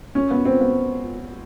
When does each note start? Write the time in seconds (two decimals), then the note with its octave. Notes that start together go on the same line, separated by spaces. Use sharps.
0.15 C#4
0.30 B3
0.45 C4
0.60 B3